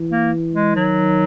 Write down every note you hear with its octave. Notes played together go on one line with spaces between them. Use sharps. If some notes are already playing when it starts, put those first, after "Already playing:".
Already playing: E3
A#3
G#3
D#3 F#3